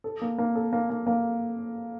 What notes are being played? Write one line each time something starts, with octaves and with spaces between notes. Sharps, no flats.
A4
A#3
A#3
A4
A#3
A#3
A#3